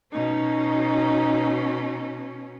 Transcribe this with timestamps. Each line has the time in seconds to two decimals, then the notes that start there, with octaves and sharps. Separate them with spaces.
0.12 B2 C#4 D#4